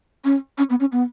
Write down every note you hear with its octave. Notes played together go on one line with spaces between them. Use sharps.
C#4
C#4
B3
C#4
B3